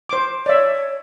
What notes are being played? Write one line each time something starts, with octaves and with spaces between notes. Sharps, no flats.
C5 D6
C#5 D5 E5